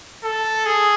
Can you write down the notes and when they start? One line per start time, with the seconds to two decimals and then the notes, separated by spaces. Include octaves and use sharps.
0.24 A4
0.66 G#4